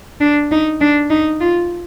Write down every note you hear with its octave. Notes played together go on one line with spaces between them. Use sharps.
D4
D#4
D4
D#4
F4